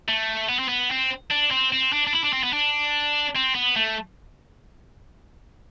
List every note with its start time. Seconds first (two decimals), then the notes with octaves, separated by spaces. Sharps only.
0.09 A3
0.49 B3
0.59 C4
0.68 B3
0.91 C4
1.31 D4
1.51 C4
1.72 C4
1.92 D4
2.07 D4
2.13 E4
2.23 D4
2.33 C4
2.43 B3
2.53 D4
3.35 C4
3.55 B3
3.76 A3